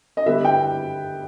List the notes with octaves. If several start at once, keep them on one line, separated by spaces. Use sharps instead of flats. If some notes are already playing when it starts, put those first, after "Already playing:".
D#5
D3 G3 B3 E5
G5